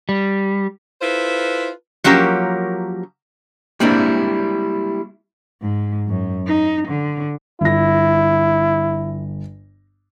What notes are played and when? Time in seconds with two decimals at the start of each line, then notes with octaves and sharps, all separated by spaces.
0.09 G3
1.02 E4 F4 A4 B4 C5
2.04 F3 F#3 A#3 C#4 G4 A#4
3.80 G3 G#3 A#3 C4 D4 E4
5.62 G#2
6.08 F#2
6.47 D#4
6.88 D3
7.61 G1 E4 A#6